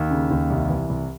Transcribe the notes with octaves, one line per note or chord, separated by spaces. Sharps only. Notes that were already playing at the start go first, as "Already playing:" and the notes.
Already playing: D#2
C#3
D#2
C2
E3
C2